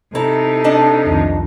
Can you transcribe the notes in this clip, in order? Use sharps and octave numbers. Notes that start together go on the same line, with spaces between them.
C3 D#4 E4 A4 A#5
D4 D#5 A5
C2 F2 D#3